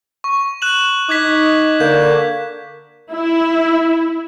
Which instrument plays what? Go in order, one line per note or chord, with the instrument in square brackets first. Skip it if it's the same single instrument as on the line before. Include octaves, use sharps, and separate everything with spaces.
[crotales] C#6
F#6 E7 F#7
[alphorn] D#4 [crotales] D6 G#6 B6
[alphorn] D3 [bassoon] A#3 [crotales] G6
[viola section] E4